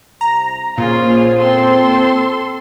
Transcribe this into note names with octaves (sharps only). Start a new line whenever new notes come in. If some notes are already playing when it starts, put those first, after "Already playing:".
C2 C3 A#5
A#2 C#4 F4 G#4 C5
C4 A4 C6